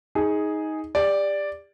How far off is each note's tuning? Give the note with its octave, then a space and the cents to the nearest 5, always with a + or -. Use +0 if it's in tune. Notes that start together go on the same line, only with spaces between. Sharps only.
D#4 +15 G#4 +0
G4 +40 D5 +0